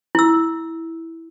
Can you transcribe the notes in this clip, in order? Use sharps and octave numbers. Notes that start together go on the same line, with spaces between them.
E4 E6